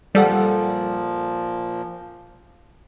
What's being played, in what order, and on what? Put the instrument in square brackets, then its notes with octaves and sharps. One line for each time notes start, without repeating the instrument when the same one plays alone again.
[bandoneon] A#2 F3 [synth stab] G3 A4 F#5